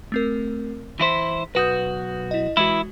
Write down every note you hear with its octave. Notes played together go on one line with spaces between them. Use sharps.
A3 C4 A#4
E3 E4 C5 B6
B1 F#4 B4 D#6 G6
E4 D#5
E3 G#3 E4 F#4